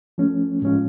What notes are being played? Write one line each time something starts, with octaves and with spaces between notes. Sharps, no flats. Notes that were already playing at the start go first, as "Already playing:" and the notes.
F3 A3 C#4
A2 F3 G#3 C#4 F4